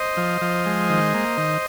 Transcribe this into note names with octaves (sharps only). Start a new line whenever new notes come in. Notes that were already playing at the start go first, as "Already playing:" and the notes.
Already playing: C5 D#5
F3
F3
G#3
D#3
A#3
D#3